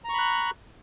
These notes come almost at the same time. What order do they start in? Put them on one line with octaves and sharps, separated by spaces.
A#5 C#6 B5 F#6